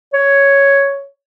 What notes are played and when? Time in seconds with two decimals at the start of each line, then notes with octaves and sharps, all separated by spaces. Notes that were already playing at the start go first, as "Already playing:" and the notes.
0.14 C#5